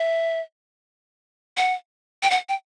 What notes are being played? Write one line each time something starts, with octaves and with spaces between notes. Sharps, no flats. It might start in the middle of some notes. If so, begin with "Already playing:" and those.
Already playing: E5
F#5
G5
F#5
G5